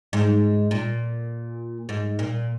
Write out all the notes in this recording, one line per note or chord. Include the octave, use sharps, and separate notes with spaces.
G#2
A#2
G#2
A#2